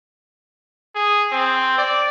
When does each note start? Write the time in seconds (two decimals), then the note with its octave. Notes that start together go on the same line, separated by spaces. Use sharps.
0.95 G#4
1.32 C4
1.78 D5